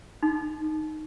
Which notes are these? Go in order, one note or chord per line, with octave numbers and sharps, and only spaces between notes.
D#4